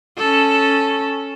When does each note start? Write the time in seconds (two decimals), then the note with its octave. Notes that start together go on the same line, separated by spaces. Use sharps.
0.18 C#4 A4